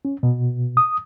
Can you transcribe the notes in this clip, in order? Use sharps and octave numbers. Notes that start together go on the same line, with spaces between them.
C#4
B2
D#6